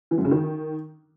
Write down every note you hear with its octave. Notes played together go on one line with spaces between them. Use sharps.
E3
F#2
C#3
D#3